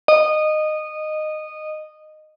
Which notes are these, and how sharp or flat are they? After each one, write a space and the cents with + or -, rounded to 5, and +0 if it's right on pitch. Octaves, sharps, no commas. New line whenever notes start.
D#5 -15